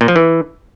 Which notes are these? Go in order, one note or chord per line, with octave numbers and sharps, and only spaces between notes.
A#2
F3
E3